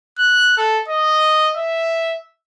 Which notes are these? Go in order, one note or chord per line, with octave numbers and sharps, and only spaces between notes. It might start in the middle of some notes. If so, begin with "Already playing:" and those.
F#6
A4
D#5
E5